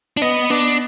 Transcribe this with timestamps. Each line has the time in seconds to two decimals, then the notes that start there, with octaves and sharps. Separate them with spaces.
0.17 D4
0.22 B3 D#5
0.50 B3 D4